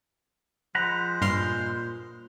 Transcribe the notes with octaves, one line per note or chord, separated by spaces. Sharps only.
F3 G#3 C5 F#5 A#5 B5
G2 A#2 C6 F6